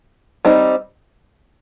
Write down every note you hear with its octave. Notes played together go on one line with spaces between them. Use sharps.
G3 C4 D#4